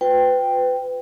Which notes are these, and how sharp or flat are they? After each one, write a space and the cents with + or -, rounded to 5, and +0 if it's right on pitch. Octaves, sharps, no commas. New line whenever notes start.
F4 +40 B4 +30 G5 +0